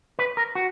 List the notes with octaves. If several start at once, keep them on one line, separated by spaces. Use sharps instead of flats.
B4
A#4
F#4